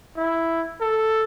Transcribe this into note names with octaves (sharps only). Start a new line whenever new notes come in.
E4
A4